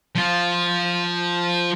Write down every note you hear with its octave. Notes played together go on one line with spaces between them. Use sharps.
F3 F4